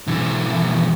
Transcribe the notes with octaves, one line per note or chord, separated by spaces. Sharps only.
B1 E3